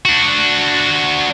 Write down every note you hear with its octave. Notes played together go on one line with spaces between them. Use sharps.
D4 F#4